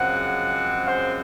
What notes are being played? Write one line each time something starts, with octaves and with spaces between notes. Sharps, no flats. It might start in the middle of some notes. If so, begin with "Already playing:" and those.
Already playing: F#2 C#3 F3 G#3 C4 F#5
C5